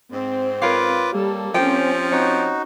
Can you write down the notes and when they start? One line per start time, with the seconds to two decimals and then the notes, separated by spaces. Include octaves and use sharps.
0.12 G#2 C4
0.62 F4 A#4 B4 C#5 F5 D6
1.13 G3 A#3 A4
1.54 F3 C4 C#4 G4 C5 G5
2.12 D#4 F#4 C#5